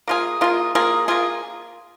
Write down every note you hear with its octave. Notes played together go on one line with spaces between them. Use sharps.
A#3 F4 G#4
A#3 F4 G#4
A#3 F4 G#4
A#3 F4 G#4